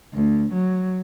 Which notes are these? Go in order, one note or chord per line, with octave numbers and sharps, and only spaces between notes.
D2
F#3